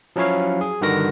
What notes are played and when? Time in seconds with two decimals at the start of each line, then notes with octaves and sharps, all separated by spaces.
0.16 F3 F#3 C#4 E4 C#5 F5
0.61 G#4
0.81 G2 D3 D#3 F#4 A#4 A#6